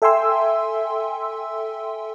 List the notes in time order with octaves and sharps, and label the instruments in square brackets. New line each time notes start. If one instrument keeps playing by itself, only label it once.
[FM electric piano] A4 E5 G5 G#5 C6 E6